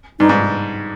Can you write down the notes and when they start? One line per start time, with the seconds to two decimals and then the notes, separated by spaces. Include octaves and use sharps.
0.19 G2 D#4
0.29 G#2